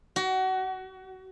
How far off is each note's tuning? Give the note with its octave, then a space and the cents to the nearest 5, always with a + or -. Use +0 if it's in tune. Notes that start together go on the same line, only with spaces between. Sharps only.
F#4 +25